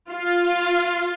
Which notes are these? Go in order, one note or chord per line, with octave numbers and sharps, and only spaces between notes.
F4